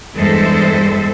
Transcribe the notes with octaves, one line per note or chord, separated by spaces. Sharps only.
E2 G2 G#3 A4 C5 E5